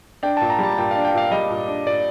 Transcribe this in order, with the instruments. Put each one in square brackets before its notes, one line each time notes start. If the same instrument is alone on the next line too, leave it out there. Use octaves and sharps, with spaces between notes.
[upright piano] D4 [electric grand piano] G5
[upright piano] A#2 [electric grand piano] A5
[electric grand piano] A#5
[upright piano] G3 [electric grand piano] A5
[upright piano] A#2 [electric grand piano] G5
[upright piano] D4 [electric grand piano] F5
[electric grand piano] G5
[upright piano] A#2 [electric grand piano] F5
[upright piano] G3 [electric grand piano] D#5
[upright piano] A#2
D4
[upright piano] A#2 [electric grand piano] D5